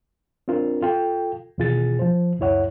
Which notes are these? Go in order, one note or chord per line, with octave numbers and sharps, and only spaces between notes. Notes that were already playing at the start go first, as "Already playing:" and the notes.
C4 D4 F4 A#4
F4 A4 G5
D#2 B2 E3 F4 G#4 A6
F3 C5
C#2 F#2 E4 C#5 F#5